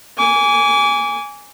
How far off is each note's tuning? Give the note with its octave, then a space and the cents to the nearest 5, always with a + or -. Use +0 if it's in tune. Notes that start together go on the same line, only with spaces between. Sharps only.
G#5 -10 D6 -35